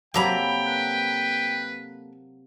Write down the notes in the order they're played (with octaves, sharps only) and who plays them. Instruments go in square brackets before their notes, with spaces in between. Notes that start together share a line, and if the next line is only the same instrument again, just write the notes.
[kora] C3 F#3 A#3 [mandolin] A4 A#5 B5 [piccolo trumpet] G5
[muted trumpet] B4